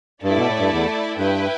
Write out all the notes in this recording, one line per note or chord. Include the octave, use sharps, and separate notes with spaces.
G2 A3 E4 A4 D5
B2
A2
G2
E2
G2 E4 B4 G5